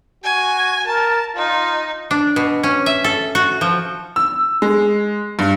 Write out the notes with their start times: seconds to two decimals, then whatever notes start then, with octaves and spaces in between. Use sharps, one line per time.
0.24 F#4 G#5
0.87 A#4 A5
1.36 D#4 F4
2.11 D4
2.36 B2
2.63 C#4
2.86 E5
3.04 A4
3.35 F#4
3.61 F3
4.16 E6
4.62 G#3
5.39 G2